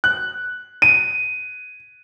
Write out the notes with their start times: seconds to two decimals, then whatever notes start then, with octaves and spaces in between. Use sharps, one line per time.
0.04 F#6
0.82 D#7